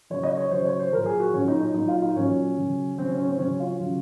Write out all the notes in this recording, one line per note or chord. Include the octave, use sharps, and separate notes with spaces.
C#3 F#3 C#5
D#5
C#5
C#3 F#3 C5
C#5
C5
A#2 F#3 A#4
G#4
F#4
A#2 F#3 C#4
D#4
D#4
A#2 F#3 D#4
F4
D#4
A#2 F#3 C#4
C#3 F#3
C#3 F#3 C4
C#4
C#4
C4
C#3 F#3 C#4
F4
C#3 F#3